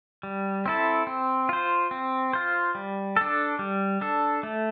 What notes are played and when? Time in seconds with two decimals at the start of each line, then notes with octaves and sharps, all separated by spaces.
0.23 G3
0.66 C4 E4 A4
1.07 C4
1.49 F4 C5
1.91 C4
2.33 F4 C5
2.75 G3
3.16 D4 A4
3.59 G3
4.01 D4 A4
4.43 A3